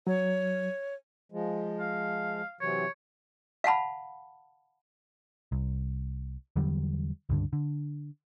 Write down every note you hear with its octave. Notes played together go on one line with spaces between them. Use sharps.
F#3 C#5
F3 G#3
F5
C3 E3 F#3 C#5
F5 F#5 A5 B5
C2
E2 D3 F#3 G3
C#2 G2 D3
D3